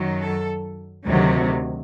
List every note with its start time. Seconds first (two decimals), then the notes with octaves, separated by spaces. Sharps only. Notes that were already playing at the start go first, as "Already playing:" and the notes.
Already playing: F#2 D#3 F#3
0.18 A4
1.07 D2 C3 D#3 F#3